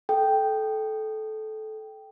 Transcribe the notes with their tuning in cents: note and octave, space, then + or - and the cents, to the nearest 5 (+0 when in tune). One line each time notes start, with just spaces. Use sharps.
A4 -20 G5 +0